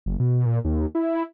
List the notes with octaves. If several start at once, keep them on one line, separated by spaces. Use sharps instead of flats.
F#1
B2
A#2
D#2
E4